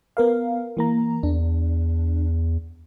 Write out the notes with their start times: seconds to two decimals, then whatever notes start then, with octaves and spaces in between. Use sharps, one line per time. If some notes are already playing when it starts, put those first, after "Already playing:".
0.17 B3 A#4 F5
0.77 E3 A#3 A#5
1.23 E2 D4